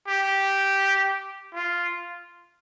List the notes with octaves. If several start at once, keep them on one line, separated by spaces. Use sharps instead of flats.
G4
F4